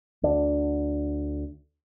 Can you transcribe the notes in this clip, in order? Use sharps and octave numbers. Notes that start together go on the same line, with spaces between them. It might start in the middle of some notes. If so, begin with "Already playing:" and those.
D2 D3 D4